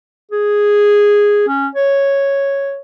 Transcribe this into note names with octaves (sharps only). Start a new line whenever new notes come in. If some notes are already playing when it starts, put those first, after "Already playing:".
G#4
C#4
C#5